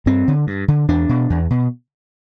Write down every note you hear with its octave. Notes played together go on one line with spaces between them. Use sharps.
G2 C4
D3
G2
D3
E2 D4
B2
E2
B2